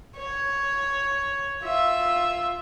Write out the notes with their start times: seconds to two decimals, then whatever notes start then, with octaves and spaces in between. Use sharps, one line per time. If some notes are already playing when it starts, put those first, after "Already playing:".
0.18 C#5
1.64 F4 E5